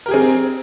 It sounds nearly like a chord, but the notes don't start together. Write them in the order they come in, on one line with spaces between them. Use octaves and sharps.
A#4 G4 G#4 C4